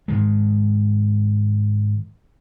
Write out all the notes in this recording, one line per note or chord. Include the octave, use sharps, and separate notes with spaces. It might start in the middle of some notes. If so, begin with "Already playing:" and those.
G#2 D#3 G#3